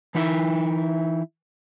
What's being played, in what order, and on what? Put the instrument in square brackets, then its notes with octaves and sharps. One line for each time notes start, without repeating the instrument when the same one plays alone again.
[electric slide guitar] E3 D#4 E4 E5